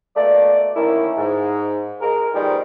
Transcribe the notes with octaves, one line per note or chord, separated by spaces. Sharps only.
B2 A3 A#3 D5
D3 D#3 A3 A#3 C#4 E4
G#2
G#3 A#4
G#2 B2 D#3 F3 G3 G#3